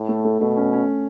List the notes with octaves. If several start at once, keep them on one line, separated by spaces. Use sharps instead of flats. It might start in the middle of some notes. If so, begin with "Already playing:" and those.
Already playing: A2
A3
A3
B2 A3
C#4
C#4